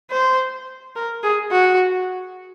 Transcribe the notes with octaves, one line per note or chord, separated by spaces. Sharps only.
C5
A#4
G#4
F#4